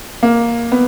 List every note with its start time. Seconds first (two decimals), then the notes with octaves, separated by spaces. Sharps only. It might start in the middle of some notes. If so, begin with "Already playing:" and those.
0.23 A#3
0.72 B3